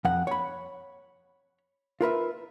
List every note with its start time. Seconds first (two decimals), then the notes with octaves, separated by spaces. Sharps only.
0.05 F2 F#5
0.27 C#5 B5
2.01 F4 A#4 B4 E5